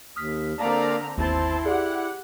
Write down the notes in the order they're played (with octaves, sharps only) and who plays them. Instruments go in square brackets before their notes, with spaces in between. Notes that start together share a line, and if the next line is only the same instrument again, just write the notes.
[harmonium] D#2 [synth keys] D#6 F6 B6
[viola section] D3 C4 A#5 [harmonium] A#3 D5 F5
[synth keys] G1 D#2 [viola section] C4 A5 C6 [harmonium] E4
[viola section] G4 F#5 [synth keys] G#4 D5